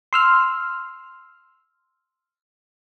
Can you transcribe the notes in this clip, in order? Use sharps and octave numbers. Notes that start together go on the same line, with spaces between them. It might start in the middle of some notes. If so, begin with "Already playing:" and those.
C6 E6 F6